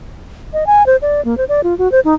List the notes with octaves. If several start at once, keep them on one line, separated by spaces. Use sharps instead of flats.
D#5
G#5
C5
D5
A#3
C5
D5
F4
F#4
C5
D#4